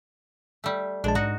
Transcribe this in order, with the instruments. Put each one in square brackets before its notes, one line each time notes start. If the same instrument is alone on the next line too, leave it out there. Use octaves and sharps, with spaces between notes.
[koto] G3 A3
[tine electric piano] A#1 G#3 A5 [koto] D4
[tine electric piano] G#2 [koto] D#4 F#4